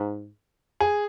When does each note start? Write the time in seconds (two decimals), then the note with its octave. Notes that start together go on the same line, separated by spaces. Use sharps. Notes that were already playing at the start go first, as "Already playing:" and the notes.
Already playing: G#2
0.80 G#4